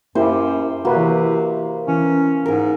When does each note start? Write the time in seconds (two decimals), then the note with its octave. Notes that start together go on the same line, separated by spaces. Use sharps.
0.15 F#2 A#3 E4 G4 C5
0.85 C3 A#3 F#4 B4
0.96 E3
1.88 E3 C#4
2.46 G#2 G#4 A#4